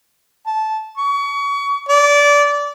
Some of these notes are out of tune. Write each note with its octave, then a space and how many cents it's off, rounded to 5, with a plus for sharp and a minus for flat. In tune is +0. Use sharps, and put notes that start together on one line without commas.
A5 -15
C#6 +30
D5 -20